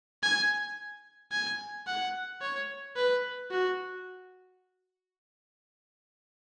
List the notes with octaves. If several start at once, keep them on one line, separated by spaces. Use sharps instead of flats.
G#5
G#5
F#5
C#5
B4
F#4